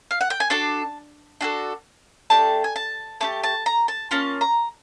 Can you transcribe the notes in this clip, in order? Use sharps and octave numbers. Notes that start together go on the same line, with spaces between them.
F5
F#5
G5
G#5
D4 F#4 A4 A5
D4 F#4 A4
A3 D4 G4 A5
G#5
A5
A3 D4 G4 A5
A5
A#5
A5
A#3 C#4 F4 A5
A#5